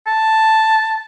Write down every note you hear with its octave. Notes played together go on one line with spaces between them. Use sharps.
A5